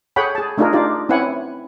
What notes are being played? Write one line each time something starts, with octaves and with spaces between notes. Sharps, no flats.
G#4 A4 C#5 F#5 G5 B5
G#4 A5
A3 D4 D#4 F4 G#4 A#4
D4 D#4 F4 G4 D5
C4 C#4 E4 B4 F#5 G#5